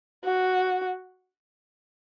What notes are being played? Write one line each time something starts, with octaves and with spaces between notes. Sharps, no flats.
F#4